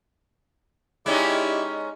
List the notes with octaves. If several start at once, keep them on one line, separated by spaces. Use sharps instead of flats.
G#3 C#4 D#4 E4 G4 D5